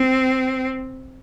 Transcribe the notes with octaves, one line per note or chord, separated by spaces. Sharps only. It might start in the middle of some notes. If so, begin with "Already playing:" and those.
Already playing: C4